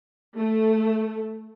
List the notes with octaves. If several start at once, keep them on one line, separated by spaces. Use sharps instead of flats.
A3